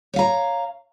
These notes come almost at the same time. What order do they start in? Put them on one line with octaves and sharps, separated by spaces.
C#5 F5 A#5